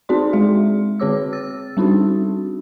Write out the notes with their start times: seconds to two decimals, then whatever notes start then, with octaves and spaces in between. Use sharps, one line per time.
0.09 C4 D#4 F#4 G#4 D5 C6
0.33 G#3 G#4 E5
1.00 D3 C4 G#4 C#5 D6 E6
1.33 E6 A6
1.77 G3 C4 D4 D#4 F#4